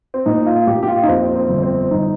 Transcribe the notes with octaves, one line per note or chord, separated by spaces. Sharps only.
C4
A#2 D#4
F4
A#2 G4
G4
F4
D#4
F2 C4
C4
G1
C4
G1 D#4